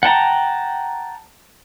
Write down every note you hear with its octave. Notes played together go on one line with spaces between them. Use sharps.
F#5 G5 A5 A#5